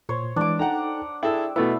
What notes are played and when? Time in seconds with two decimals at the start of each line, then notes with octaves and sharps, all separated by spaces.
0.09 A#2 C5 C#5
0.36 E3 G#3 D4 D6
0.59 D#4 A4 F#5 G5 A#5
1.23 E4 G#4 A4 G5 E6
1.56 B2 A3 B3 E4